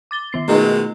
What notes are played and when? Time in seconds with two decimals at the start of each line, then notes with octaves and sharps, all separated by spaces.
0.11 D6 A6 G7
0.33 D#3 B3 C7
0.48 B2 D#3 G#3 A3 D#4 F4